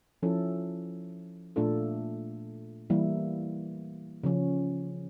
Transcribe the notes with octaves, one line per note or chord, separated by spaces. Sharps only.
F3 C#4 E4 A4
A#2 A3 D4 F4 A4
E3 G3 A#3 E4
C#3 F3 C#4